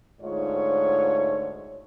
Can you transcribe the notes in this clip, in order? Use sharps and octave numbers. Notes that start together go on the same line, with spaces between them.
D2 G#2 F4 C#5